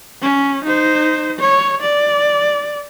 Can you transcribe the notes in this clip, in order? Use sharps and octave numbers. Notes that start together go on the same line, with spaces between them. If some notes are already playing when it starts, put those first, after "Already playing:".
C#4
D#4 C5
C#5
D5